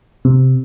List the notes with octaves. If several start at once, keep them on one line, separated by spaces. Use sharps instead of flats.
C3